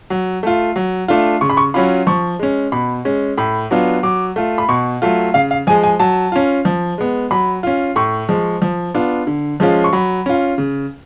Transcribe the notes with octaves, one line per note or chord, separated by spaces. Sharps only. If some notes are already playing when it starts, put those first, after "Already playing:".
F#3
A3 F4
F#3
A3 D4 F4
C#3 C#6
B5
C#6
F#3 C#4 F4 B5
F3 C#6
G#3 C#4
B2 B5
G#3 C#4
A2 B5
F#3 B3 D4 F4
F#3 D6
A3 F4
B5
B2 C#6
F#3 A3 F4
C#3 F5
F5
F3 G#3 G#5
G#5
F#3 A5
C#4 F4
F3
G#3 B3
F#3 B5
C#4 F4
A2 C#6
F3 G#3
F3
B3 D4 F4
D3
F3 G#3 C#4 F4
C#6
F#3 B5
C#4 F4
C#3